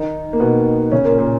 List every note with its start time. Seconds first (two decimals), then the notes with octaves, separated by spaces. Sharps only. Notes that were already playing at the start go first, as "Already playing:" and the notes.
Already playing: D#3 D#4
0.33 A#3
0.40 B2 B3
0.92 C#3 C#4
1.05 A#2 A#3
1.18 A#2 A#3